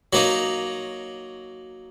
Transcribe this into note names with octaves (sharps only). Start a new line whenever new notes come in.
F#3 A#3 D#4